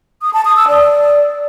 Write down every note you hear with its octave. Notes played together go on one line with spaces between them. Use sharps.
D#6
A5
D#6
E6
D5